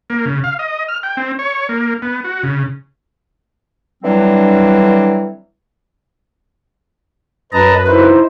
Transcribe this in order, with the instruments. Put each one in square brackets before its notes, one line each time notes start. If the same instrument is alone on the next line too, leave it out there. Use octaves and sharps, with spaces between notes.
[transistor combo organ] A#3
C#3
F5
D#5
F6
G5
C4
C#5
A#3
B3
F#4
C#3
[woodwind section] D3 E3 F#3 G3 C4 D4
[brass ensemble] F#2 B4 [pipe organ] D#5 A5 A#5
[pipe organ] D#4 E4 C5